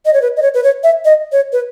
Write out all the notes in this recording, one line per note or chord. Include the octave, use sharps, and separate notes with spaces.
D#5
C#5
B4
D#5
C#5
B4
C#5
E5
D#5
C#5
B4